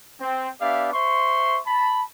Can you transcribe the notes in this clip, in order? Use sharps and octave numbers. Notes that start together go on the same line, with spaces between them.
C4
B3 D4 G4 D5 E5 F5
C5 E5 C6 C#6
A5 B5